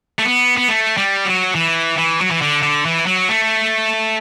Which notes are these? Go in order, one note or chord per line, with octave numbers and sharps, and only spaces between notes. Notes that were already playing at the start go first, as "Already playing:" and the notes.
A3
B3
B3
A3
G3
F#3
E3
E3
F#3
E3
D3
D3
E3
F#3
A3